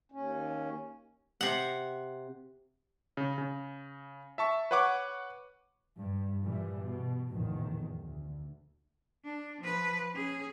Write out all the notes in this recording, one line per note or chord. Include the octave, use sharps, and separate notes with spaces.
D#2 C#4
C3 F#5
C#3
C#3
E5 A5 C#6
B4 C#5 F#5 C#6 D6
G2
G2 A#2 E3 G3
B2
F1 A#1 E2 A2 D#3
D2
D4
F3 B4
C#4 G#4